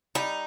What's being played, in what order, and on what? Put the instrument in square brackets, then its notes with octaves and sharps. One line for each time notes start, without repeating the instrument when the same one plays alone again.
[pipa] G3 [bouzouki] D#4